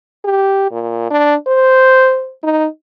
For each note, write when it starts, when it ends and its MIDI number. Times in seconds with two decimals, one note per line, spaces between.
0.25 0.71 67
0.72 1.07 46
1.11 1.35 62
1.47 2.32 72
2.43 2.66 63